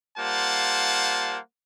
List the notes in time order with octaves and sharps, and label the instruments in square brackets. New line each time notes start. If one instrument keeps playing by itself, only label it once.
[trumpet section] G3 A#3 F4 C5 F#5 A5